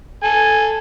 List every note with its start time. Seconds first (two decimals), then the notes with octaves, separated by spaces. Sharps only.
0.23 A4 G#5